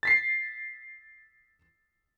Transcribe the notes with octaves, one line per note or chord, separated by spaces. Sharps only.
A6 B6 C7